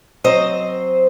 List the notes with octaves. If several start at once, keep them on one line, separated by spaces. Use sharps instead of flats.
F#3 C4 C5 D#5